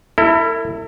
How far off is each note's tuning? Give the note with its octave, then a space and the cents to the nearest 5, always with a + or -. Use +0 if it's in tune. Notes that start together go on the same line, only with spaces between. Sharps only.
E4 +0 A4 +45